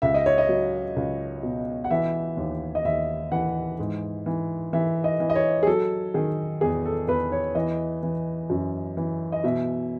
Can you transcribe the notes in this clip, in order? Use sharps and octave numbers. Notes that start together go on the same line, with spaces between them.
C#2 E5
D#5
C#5
D#5
F#3
C#2
B2
F#5
E3 E5
D#2
D#5
D#2 E5
E3 F#5
G#2
E3
E3 E5
D#5
E3
D#5
C#5
G#4
F#3 A4
D#3 G#4
E2 G#4
A4
E2 B4
C#5
E3 D#5
E3
F#2
E3
D#5
B2 E5